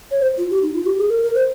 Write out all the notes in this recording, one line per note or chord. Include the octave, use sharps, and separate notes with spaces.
C#5
C5
F4
G4
D#4
F4
G4
G#4
A#4
A#4
C5